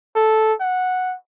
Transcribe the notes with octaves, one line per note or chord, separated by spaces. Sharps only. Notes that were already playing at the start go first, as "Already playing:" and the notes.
A4
F#5